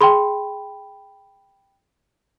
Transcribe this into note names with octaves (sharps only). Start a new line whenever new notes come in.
G#4 G5 B5 C6